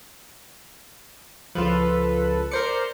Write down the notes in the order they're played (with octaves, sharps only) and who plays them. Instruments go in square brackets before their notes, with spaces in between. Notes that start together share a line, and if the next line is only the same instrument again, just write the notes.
[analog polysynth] C#2 A4 B4 [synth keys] F3 F4
[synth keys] A#4 C5 C#7 [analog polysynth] D5